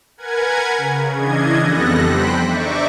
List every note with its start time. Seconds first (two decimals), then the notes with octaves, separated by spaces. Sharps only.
0.17 A#4 B4 F#5 G#5 G#6
0.77 C#3
1.16 C#3 E3 D4 D#5 G#6
1.60 F2 G3 B3 A4 F#6 A#6
2.02 C5 G5 B5 F#6
2.45 D4 D#4 E5 C#6 D6